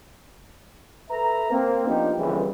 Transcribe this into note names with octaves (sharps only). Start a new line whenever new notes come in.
A4 B4 E5 A#5
A#3 C4
F3 A#3 B3 D4 D#4 G4
G1 C2 F2 C#3 E3 G3